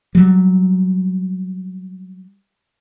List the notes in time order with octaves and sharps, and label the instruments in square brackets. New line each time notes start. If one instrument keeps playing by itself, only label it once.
[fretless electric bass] F#3 G3